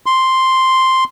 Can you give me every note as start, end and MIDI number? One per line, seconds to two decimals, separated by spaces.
0.06 1.04 84